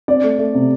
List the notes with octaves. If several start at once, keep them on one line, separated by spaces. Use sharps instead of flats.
C4 D5
A3
A3
C3